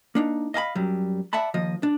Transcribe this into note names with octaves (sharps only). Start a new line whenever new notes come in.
A#3 D4 D#4
D#5 F5 G#5 B5
F#2 F#3 G3
D5 E5 F#5 A5 B5
D#2 F3 D#5
D4